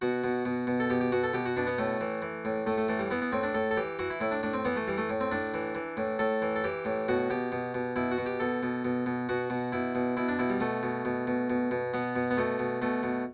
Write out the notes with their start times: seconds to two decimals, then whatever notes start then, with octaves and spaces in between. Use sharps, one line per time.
0.02 B2 F#4
0.24 B2
0.45 B2
0.67 B2
0.80 A4
0.90 B2 G4
1.00 G4
1.12 B2 F#4
1.23 A4
1.33 B2 G4
1.46 F#4
1.57 B2 D4
1.67 B3
1.78 A2 A3
2.01 E3
2.22 E3
2.45 A2
2.67 A2 A3
2.77 A3
2.89 E3 A3
2.99 G3
3.11 E3 B3
3.22 B3
3.32 A2 C4
3.43 D4
3.54 A2 A4
3.71 A4
3.77 E3 G4
3.99 E3 F#4
4.10 E4
4.21 A2 E4
4.31 D4
4.43 A2 D4
4.54 C4
4.65 E3 B3
4.76 A3
4.88 E3 G3
4.98 A3
5.10 A2
5.21 C4
5.31 A2 D4
5.54 E3
5.75 E3
5.97 A2
6.19 A2 A4
6.42 E3
6.55 A4
6.64 E3 G4
6.85 A2
7.08 B2 F#4
7.30 B2 G4
7.52 B2
7.74 B2
7.96 B2 E4
8.11 F#4
8.18 B2
8.26 G4
8.40 B2 A4
8.63 B2
8.85 B2
9.06 B2
9.29 B2 F#4
9.50 B2
9.72 B2 E4
9.95 B2
10.17 B2 E4
10.28 D4
10.39 B2 E4
10.50 G3
10.60 B2 A3
10.83 B2
11.05 B2
11.27 B2
11.50 B2
11.71 B2
11.93 B2 B3
12.16 B2
12.31 B3
12.37 B2 A3
12.59 B2
12.82 B2 A3
13.03 B2